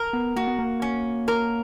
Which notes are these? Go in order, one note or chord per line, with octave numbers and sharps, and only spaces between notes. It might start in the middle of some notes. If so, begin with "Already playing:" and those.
Already playing: A#4
B3
A#3 F#4
B3
A#3
C#4
A#4